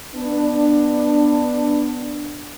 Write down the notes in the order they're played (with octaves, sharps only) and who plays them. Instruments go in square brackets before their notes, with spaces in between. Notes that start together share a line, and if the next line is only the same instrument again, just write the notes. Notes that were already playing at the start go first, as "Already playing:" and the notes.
[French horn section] B3 D4